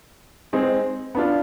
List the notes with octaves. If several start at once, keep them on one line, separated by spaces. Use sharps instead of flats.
G#3 C4 D#4 G#4
B3 D4 F4